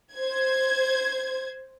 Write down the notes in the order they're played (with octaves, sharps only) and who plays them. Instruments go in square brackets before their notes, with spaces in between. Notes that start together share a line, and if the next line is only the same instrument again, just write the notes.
[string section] C5 G#6